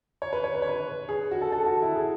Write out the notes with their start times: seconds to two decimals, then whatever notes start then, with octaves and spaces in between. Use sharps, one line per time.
0.22 C#5
0.33 B4
0.44 C#5
0.54 B4
0.62 C#5
0.69 B4
1.09 G#4
1.31 F#4
1.41 A4
1.52 A4
1.66 F#4
1.82 E4
1.95 G#4